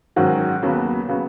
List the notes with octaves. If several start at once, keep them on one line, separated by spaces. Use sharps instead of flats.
G#2 D#3 F#3 C#4 F#4
D#2 C#3 F#3 B3
C#3 F#3 B3